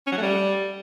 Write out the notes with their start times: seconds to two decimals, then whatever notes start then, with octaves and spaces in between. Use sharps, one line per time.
0.07 C#4
0.12 F#3
0.17 A3
0.22 G3